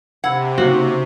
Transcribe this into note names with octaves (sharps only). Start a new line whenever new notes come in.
C3 F#5 B5 E6 G#6
C#3 A#3 C#4 D#4 F#4